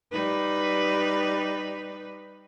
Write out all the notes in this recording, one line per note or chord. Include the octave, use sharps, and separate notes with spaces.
G3 D#4 B4